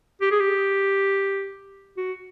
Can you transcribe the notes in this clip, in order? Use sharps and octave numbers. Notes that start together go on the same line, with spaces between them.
G4
G#4
G4
F#4